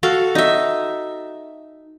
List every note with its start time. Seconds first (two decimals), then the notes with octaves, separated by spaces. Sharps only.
0.03 F#4 A4 F5
0.35 D#4 E5